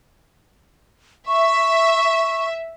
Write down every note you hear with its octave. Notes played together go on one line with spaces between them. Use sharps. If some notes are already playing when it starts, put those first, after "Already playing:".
E5 C#6